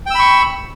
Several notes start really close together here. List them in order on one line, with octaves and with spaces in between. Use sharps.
G5 E6 B5 C#6